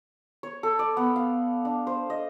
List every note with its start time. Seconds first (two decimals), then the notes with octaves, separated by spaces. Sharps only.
0.43 C#5
0.63 A4
0.79 D5
0.97 B3
1.16 F5
1.65 D4
1.87 C5
2.10 D#5